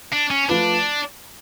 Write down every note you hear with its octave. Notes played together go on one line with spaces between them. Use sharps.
D4
C#4
F3 A3 D4 F4 B4